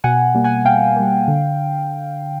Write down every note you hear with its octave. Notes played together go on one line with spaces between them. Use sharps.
B2 F#5 G#5
G3 A#3
F#5 G#5
B2 F5 G5
G3 A#3
D3